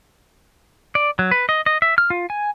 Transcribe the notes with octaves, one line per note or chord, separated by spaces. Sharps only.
D5
F#3
B4
D#5
D#5
E5
F6
F4
G#5